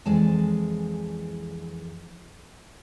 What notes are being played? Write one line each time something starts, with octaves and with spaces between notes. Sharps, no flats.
F2 E3 G#3 D5 A5